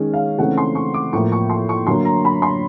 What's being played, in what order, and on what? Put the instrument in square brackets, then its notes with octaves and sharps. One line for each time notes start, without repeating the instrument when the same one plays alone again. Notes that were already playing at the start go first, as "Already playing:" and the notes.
Already playing: [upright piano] D#3 G#3 C#4
F5
C#3 E3 A3 C4 D#4 F#5
C6
C#6
D6
A2 F3 A#3 C#6
C#6
C6
C#6
D3 F#3 A#3 C6
A#5
B5
C6